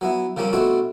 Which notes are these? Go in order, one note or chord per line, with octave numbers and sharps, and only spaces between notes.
F#3 B3 E4
C#3 F3 G3 A#3 C4 C#4
B2 A3 C4 D4 E4 F#4